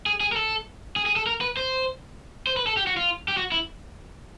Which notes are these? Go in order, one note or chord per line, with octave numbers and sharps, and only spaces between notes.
G#4
G#4
A#4
A4
G#4
G#4
A4
A#4
B4
C5
C5
B4
A4
G4
F#4
F4
G4
F#4
E4